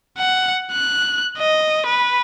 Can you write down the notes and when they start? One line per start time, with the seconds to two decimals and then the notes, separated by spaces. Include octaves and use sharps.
0.18 F#5
0.72 F#6
1.38 D#5
1.86 B4